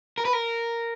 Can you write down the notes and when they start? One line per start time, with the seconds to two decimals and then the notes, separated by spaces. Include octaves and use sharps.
0.18 A#4
0.25 B4
0.33 A#4